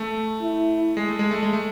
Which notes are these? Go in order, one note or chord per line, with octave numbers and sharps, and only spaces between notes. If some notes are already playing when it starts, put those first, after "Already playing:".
Already playing: A3
E4
G#3
A3
G#3
A3
G#3
A3